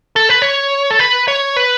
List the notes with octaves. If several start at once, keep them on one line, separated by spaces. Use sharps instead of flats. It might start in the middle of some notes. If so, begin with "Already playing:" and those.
A4
B4
C#5
A4
B4
C#5
B4